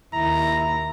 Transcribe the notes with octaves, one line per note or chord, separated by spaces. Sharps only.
D#2 E4 A#5